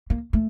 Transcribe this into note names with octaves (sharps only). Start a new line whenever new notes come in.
A#3
A3